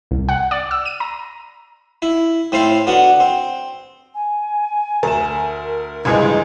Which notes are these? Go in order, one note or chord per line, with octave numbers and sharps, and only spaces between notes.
C2
F#5
D5
E6
D#7
A#5
E4
A2 C4 E4 C5 F5
D3 B3 F#4
C4
G#5
D2 A#4 E7
C#2 G2 E3 F3 G#3 G#5 G#6